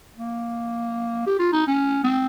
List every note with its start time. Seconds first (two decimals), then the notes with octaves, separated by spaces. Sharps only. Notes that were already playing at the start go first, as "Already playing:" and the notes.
0.17 A#3
1.26 G4
1.39 F4
1.52 D#4
1.67 C#4
2.04 C4